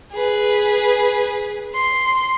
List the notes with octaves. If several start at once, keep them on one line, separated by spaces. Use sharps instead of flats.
G#4 B4
C6